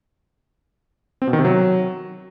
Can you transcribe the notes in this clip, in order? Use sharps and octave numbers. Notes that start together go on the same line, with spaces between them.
C4
B2
D#3
C3
F#3